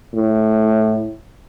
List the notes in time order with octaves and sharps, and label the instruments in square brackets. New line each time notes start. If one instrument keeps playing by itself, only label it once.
[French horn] A2